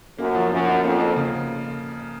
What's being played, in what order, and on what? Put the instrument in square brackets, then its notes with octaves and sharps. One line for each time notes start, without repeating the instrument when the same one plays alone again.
[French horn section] F#2 [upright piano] A#3
[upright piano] F3
[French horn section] F#2 [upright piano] F3
[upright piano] D#4
[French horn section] F2 [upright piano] A#3
[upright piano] A#3
C#3